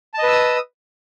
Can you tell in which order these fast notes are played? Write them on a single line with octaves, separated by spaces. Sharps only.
A5 D#5 B4 E6 D#6